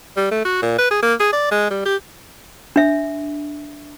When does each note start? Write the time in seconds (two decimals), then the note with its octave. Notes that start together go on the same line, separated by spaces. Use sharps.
0.17 G3
0.31 A3
0.45 F#4
0.62 A#2
0.78 B4
0.91 G#4
1.02 A#3
1.20 G#4
1.33 D5
1.51 G#3
1.70 G3
1.85 G4
2.76 D4 E5